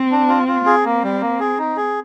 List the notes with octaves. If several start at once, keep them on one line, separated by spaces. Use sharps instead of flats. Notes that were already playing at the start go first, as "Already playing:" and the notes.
Already playing: C4
D4
F4
F4
C4 G#4
A#3
G3
A#3
G#4
D#4
G#4